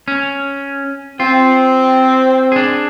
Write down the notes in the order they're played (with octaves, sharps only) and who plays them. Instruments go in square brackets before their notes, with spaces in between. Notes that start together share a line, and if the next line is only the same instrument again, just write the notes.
[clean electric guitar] C#4
[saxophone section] C4 [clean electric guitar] F4
[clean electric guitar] D4 G#4